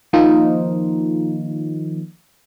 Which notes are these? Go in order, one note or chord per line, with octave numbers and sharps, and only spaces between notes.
D#3 F3 A#3 D#4 F4